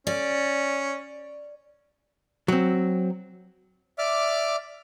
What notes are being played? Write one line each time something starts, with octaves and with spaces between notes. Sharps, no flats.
C#4 D5
F#3 C4
D5 E5 D6 F6